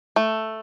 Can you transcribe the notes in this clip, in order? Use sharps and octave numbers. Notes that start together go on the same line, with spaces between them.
A3